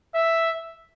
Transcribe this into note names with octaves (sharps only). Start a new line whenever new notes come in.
E5